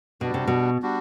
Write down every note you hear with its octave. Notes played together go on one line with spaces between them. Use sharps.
B2 G3 D4 F#4
C3
B2
G3 D4 F#4